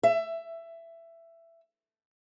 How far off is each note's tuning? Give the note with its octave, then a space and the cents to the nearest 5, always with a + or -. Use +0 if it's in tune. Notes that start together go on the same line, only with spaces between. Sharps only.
E5 +15